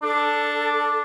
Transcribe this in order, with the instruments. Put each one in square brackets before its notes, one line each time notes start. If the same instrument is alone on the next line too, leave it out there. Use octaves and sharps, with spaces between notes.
[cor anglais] D4 [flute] A4